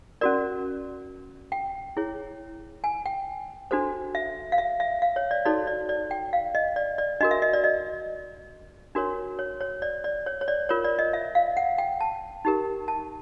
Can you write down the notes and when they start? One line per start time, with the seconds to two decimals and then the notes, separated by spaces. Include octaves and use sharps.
0.21 C#4 F#4 A#4 D5
1.52 G5
1.97 E4 G#4 C#5
2.84 G#5
3.06 G5
3.71 D4 F#4 A4 C5
4.15 E5
4.52 F5
4.58 E5
4.80 E5
5.02 F5
5.16 C#5
5.31 D5
5.45 D#4 F#4 A4 C#5 D5
5.67 D5
5.89 D5
6.11 G5
6.33 F5
6.55 D#5
6.76 D5
6.98 D5
7.20 D4 F#4 A#4 D#5
7.31 E5
7.42 D#5
7.53 D5
7.64 D#5
8.95 D4 F#4 A#4 C#5
9.39 C#5
9.61 C#5
9.82 D5
10.04 D5
10.26 C#5
10.41 C#5
10.48 D5
10.69 F4 A#4 C#5
10.84 D5
10.99 D#5
11.13 E5
11.35 F5
11.57 F#5
11.78 G5
12.01 A5
12.45 D#4 G4 A#4
12.88 A5